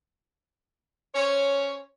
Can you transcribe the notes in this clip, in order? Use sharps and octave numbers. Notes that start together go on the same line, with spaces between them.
C#4 C5 C#5